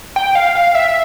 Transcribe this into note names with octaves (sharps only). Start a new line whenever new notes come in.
G5
F5
F5
E5